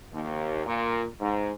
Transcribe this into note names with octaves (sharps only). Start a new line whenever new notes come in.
D#2
A#2
G#2